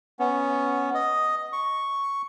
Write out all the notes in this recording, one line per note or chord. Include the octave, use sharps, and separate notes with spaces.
B3 C#4
D#5
C#6